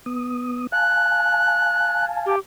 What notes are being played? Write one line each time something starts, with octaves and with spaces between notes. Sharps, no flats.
B3 D#6
F5 G#5 A5 F#6
G4